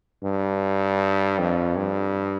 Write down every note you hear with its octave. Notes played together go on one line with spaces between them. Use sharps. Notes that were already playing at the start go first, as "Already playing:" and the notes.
G2
F2
G2